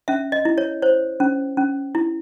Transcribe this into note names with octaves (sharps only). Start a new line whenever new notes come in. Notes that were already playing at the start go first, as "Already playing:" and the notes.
C#4 E5
D#5
E4
C#5
C5 C#5
C#4
C#4
E4